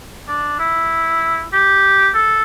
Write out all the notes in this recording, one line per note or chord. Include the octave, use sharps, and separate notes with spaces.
D4
E4
G4
A4